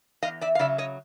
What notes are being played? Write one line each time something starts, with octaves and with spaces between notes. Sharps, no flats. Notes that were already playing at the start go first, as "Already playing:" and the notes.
E2 D#5 F5
D5 E5
F5
C#3 F#3 D5 E5
C#5 D#5